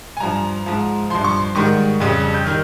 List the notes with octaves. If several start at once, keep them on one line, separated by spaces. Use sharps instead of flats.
G#5
G2 F3 A#5
G#2 F3
G2 F3 C6
C#6
C6
G#2 D#3 G3 C#6
F2 C#3 G3
G6
D#3 G3 F6